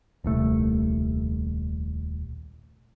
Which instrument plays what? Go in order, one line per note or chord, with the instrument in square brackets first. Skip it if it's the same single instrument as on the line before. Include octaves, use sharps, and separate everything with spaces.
[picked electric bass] D#1 C2 A3